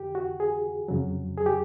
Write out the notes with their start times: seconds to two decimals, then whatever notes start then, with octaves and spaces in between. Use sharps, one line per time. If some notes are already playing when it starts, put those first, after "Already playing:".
Already playing: F2 D3 G4
0.15 F#4
0.40 G#4
0.88 F2 C#3 F#3
1.37 G#4
1.46 G4